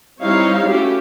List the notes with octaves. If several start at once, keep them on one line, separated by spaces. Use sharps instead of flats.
G3 C4 D#4 E4 C#5 F5
A3 C#4 E4 F#4 G4